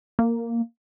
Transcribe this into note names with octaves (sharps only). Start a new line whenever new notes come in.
A#3